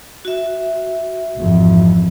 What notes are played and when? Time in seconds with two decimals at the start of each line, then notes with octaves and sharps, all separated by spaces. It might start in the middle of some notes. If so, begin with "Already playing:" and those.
0.25 F#4 E5
1.38 G#1 F2 E3